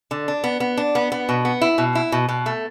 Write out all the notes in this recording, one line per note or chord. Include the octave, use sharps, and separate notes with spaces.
D3
D4
B3
B3
D4
B3
B3
B2
B3
E4
B2
E4
B2
B2
A3